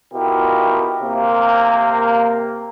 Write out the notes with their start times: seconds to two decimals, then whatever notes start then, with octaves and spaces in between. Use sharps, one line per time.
0.12 B2 E4 F4 G4 A#4
1.01 C3 A#3